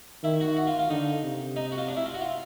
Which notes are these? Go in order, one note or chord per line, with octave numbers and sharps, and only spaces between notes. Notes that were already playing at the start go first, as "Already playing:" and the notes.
D#3 E4
F#4
F#4
F4
F4
D3 D#4
C3
D#4
F#4
F4
D4
E4
F4
F#4
F4